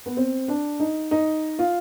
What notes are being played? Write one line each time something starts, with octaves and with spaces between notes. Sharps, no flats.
B3
C4
D4
D#4
D#4
F4